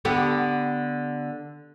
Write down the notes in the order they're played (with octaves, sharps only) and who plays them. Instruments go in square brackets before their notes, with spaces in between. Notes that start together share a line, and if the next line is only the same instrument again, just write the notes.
[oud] D3 B3 G4